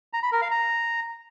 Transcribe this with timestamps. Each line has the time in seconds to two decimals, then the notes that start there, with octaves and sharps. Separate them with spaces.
0.13 A#5
0.23 B5
0.32 A#4
0.42 F5
0.51 A#5